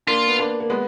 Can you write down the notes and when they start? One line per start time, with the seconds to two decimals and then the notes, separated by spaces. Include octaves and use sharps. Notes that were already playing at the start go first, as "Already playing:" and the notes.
0.07 A#3 D4 F4
0.28 B3
0.39 A#3 D4
0.60 A#3
0.70 G#3 B3